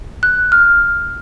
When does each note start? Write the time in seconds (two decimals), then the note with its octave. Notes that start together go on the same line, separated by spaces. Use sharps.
0.23 F#6
0.52 F6